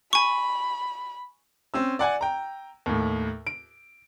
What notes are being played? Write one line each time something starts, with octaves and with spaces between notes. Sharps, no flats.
G#5 B5 C#6
C4 C#4 E6
D5 F#5 G#5
G5 A#5
D#2 A2
D7